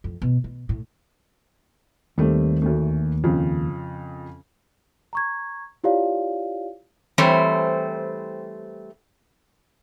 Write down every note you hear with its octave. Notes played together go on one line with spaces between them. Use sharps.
F2
B2
B2
A2
D#2 G3 A3 C4
D2 A3
F2 C#3
A#5 C#6 G#6
E4 F4 G4 C#5 D5 F5
E3 G3 A3 C4 C5 C#5